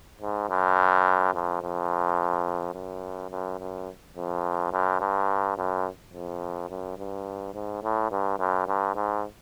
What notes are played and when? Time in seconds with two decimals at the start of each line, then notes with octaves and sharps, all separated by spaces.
0.21 G#2
0.49 F#2
1.34 F2
1.62 F2
2.74 F#2
3.31 F#2
3.60 F#2
4.16 F2
4.72 F#2
5.00 G2
5.58 F#2
6.13 F2
6.69 F#2
6.98 G2
7.54 G#2
7.83 A2
8.11 G2
8.39 F#2
8.67 G2
8.95 G#2